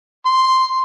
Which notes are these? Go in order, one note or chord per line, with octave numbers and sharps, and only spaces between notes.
C6